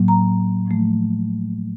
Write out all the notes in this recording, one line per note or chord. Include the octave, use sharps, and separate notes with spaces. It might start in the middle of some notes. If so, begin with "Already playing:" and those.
Already playing: A2 F#3 A#3
A#5
A2 F3 A3